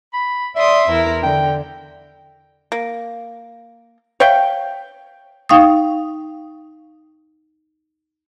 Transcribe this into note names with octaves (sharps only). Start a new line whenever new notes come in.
B5
D5 E5 C6 D#6
E2 E4 A#4
D3 G5
A#3
C#5 E5 F5 G5
D#4 F5 G5 C#6 D#6